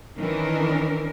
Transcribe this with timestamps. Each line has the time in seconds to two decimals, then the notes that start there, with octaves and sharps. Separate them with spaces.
0.18 D#3 E3 C#4 D4 A#4